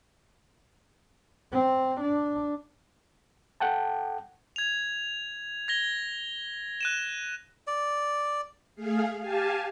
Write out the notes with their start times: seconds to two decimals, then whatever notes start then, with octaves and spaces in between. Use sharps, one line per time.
1.52 C4
2.00 D4
3.60 A4 F#5 G5 A5
4.56 G#6 F7
5.68 G#6 A#6 G7
6.81 F#6 D#7 E7
7.67 D5
8.76 A3 G#4 F5
9.20 G4 F5 G#5 A5